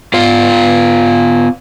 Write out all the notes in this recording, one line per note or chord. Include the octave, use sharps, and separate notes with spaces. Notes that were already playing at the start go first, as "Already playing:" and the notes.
B3 F4 F5